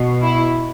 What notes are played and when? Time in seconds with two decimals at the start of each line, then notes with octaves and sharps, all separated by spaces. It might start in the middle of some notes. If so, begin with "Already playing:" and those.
Already playing: B2
0.23 E4